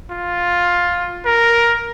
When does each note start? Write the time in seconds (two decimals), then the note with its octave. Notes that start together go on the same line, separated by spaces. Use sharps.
0.11 F4
1.26 A#4